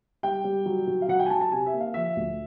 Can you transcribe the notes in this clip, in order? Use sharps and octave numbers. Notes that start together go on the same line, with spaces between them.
G3 G5
G3
F#3
F#3
F5
F#3 F#5
G5
G#5
F#3 A5
A5
C3 G#5
E5
A#3
F5
F3 E5
D2